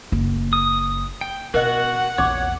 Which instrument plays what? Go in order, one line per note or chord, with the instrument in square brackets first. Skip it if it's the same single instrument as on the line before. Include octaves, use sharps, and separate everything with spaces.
[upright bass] F#1
[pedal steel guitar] D#6
G5
[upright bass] B2 [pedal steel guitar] F#4 [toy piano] A#4 D#5 [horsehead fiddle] F#5
[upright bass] A#1 E2 [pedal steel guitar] C#5 [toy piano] C#6 D6